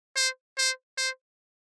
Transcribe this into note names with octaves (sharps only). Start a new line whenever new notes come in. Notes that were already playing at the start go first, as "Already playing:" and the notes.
C5
C5
C5